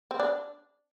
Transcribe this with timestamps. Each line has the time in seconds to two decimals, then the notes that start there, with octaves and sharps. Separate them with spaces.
0.11 C4
0.20 D4